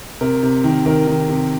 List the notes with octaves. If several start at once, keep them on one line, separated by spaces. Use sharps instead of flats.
C3 A#4
C3
D#3
D#3 A#4
D#3
C3